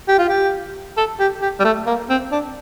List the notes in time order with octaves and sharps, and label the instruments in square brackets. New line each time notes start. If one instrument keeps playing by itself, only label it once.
[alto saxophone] G4
F4
G4
A4
G4
G4
G3
A3
A#3
C4
D4